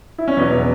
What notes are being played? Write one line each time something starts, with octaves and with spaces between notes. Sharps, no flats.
E4
C#4
E2 B2 F#3 B3
B3